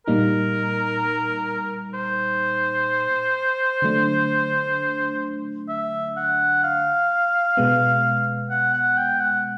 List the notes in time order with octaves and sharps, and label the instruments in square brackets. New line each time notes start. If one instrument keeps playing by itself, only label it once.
[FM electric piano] A#2 G3 A#3 D#4 [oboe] A#4
[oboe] C5
[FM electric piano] D3 F#3 A3 D4
[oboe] E5
F#5
F5
[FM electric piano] B2 G#3 B3
[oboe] F#5
F#5
G5
F#5